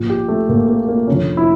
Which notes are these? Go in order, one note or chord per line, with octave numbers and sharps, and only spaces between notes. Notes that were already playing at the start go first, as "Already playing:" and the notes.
Already playing: A#1 A#2 F3
G4
A3
A#1 A#2 F3 A#3
A#3
A#3
F1 F2 D3 F3 C#4
E4